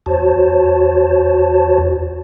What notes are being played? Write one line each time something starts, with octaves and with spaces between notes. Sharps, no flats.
E2 F#4 C5 C#5 A5